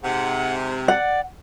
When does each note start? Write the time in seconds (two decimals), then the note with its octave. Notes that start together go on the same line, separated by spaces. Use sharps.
0.03 G#2 C3 F#5
0.88 D5 F#5